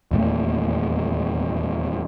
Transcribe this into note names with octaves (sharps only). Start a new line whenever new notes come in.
D#1 E2 A#2 A3